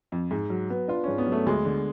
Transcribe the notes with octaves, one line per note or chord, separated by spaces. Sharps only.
F2
G#2
F#3
B3
D4 F4
G#2 C#4
B3
F#3
A3
D2 G#3
D3